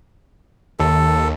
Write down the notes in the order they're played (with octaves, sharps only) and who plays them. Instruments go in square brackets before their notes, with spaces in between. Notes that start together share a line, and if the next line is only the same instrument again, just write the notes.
[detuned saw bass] D#2 [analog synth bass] D#3 [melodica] A4